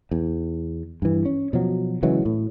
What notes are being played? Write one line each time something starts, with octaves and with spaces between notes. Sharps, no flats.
E2
G2 E3
C#4
B2 F3 F#3
C#3 E3 F#3 G#3
A2